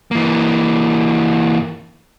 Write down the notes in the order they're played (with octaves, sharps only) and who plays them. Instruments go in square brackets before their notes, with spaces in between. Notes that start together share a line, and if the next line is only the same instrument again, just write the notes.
[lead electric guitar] E3 A#3